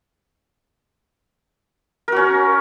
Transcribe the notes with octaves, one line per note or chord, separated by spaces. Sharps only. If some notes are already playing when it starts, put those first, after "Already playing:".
C#4 F#4 A#4